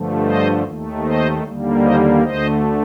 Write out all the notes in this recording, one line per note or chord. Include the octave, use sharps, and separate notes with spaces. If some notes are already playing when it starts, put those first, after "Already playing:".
Already playing: G2 D3 F3 A3
C5 D#5
D#2 D#3 A3
C5 D#5
D#2 D3 G3 A#3
C5 D#5
D2 D3 A3 C5 D#5